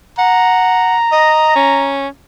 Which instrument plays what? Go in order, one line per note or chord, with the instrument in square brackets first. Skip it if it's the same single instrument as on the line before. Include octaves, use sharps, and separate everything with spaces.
[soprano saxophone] F#5 [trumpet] A#5
[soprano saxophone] D#5
C#4